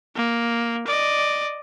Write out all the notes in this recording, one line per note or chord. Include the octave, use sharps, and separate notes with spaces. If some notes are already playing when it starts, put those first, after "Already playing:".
A#3
D5 D#5